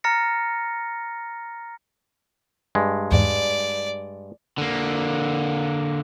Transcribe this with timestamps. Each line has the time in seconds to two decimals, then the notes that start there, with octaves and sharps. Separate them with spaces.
0.04 A#5 F6 A6 A#6 C#7
2.75 G2 G#3
3.11 E2 G#2 D5
4.58 D3 A#3